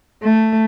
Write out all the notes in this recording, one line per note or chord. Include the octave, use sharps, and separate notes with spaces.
A3